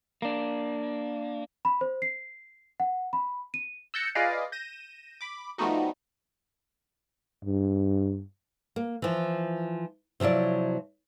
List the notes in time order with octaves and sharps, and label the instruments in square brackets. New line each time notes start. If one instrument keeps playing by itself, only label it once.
[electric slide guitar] A#3 D4
[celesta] B5
C5
C7
F#5
B5
D#7
[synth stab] E6 F#6 G6 A6 A#6 C#7
F4 G#4 B4 D5 D#5 F5
G6 A#6 D#7 E7
B5 D6
F3 G3 A3 B3 D#4 F#4
[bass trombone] G2
[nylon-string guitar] A#3
E3 F3
C3 F3 F#3 E4 D5